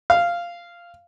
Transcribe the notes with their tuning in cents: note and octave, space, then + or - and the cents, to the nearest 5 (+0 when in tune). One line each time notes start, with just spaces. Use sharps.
F5 -10